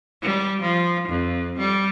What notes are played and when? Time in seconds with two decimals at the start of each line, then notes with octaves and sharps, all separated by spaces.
0.22 G3
0.61 F3
1.08 F2
1.58 G3